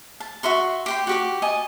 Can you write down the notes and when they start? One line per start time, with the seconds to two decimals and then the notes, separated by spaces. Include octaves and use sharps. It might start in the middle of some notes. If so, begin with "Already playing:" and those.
0.20 A5
0.43 F#4 E5 C6 C#6
0.86 G4 G5 C6
1.07 F#4 G4 D6
1.42 D#5 G#5 A5